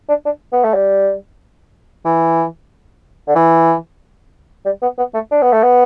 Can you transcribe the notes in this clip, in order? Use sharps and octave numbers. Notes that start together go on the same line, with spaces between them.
D4
D4
B3
A3
G3
E3
D3
E3
G3
B3
B3
A3
D4
B3
A3
B3